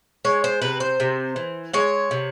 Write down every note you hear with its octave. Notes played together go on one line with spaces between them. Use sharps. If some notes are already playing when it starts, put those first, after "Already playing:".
G#3 C#5
C5
C3 B4
C5
C3
E3
G#3 C#5
C3